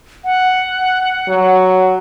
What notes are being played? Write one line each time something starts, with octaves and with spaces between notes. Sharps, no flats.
F#5
F#3